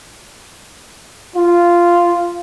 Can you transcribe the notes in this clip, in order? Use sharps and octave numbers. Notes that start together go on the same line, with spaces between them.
F4